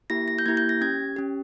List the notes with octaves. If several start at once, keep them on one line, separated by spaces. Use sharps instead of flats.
A#3 E4 G4 A#6
A#6
G6
A#3 E4 G4 G#6
G6
A#6
C#4 G4 G#6
C#4 G4